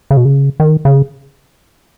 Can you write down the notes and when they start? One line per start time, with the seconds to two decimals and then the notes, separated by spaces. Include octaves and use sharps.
0.11 C#3
0.17 B2
0.25 C#3
0.60 D#3
0.85 C#3